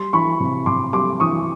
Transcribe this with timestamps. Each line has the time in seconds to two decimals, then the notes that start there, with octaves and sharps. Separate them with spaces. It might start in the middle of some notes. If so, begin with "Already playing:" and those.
Already playing: G3 C6
0.13 E3 B5 C#6
0.40 C3
0.66 C3 C6 D6
0.93 G3 C6 D6
1.20 E3 C#6 D#6